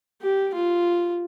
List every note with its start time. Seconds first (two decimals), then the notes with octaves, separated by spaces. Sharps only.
0.22 G4
0.54 F4